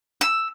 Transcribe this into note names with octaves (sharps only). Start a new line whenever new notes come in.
E6